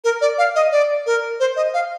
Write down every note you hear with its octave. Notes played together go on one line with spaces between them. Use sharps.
A#4
D5
F5
D#5
D5
A#4
C5
D#5
F5